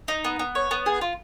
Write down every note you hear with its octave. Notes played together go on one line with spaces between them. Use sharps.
D#4
B3
B3
C#5
B3
G#4
F4